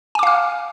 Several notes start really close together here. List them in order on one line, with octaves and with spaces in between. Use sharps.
G#5 D6 F5 F6